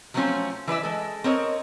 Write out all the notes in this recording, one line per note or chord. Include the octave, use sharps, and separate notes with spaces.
F3 F#3 A3 C4 C#4 F4
E3 B4 D5 E5
G#3 A4
C4 A#4 C#5 D#5